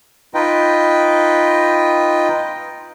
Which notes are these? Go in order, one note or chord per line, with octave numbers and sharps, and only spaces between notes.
D#4 F4 B4 D#5 G5